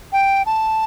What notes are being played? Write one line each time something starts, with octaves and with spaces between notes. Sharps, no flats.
G5
A5